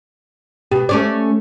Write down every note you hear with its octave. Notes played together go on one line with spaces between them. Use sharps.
B2 G4
A3 C#4 D5